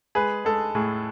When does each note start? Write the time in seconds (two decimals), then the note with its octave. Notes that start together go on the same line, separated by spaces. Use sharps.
0.15 G#3 G#4 B4
0.45 G#3 A4
0.75 A2 G#4